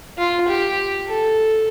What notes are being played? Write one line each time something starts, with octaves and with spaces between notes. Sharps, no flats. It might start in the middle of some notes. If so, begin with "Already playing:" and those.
F4
G4
A4